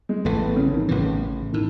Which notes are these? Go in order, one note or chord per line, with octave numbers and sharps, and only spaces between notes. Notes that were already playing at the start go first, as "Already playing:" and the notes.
G#3
A1 A2 E3 A3
B3
C#3
D#3
A1 A2 C#3 E3
A2 D#3